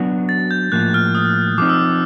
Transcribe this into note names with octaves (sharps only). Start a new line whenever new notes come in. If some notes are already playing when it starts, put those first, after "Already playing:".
Already playing: F#3 B3 D4 F#4
A6
G6
A2 F3 A#3 F#6
F6
D#6
F3 G#3 C4 D#4 D6
E6